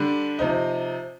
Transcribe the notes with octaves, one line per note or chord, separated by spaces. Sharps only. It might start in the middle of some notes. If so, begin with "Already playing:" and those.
Already playing: D3 G3 D4
C3 F3 C4 D#4